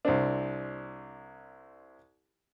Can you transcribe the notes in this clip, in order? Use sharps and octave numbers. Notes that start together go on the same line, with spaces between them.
C2 C4 D4